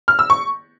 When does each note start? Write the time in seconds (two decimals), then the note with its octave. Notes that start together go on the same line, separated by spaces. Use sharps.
0.08 F6
0.19 E6
0.30 C#6